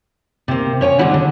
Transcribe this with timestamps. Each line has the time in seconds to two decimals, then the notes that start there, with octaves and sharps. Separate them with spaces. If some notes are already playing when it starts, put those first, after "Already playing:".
0.48 C3 A#3
0.81 C#4 C#5 G5 G#5
0.98 D3 G3 G#3 B3 E4 F#5
1.14 D3